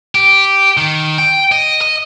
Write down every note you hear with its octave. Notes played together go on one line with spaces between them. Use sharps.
G4
D#3
G5
D#5
D#5